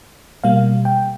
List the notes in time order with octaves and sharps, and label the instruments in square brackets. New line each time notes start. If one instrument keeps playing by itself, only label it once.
[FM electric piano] B2 G3 A#3 F5
G5